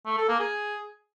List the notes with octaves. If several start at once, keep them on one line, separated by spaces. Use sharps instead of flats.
A3
A4
A#3
G#4